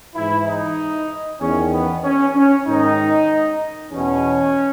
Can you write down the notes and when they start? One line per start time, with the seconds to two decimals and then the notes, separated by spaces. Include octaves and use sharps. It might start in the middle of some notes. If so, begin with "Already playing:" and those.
0.15 G#2 E3 E4
0.46 D#4
1.40 E2 D#3 C#4
1.73 B3
2.03 C#4
2.34 C#4
2.67 G#2 D#3 D#4
3.92 E2 B2 C#4